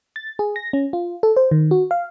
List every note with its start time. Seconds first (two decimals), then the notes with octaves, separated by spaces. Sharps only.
0.16 A6
0.39 G#4
0.56 A#6
0.73 C#4
0.93 F4
1.23 A4
1.36 C5
1.51 D#3
1.71 F#4
1.91 F5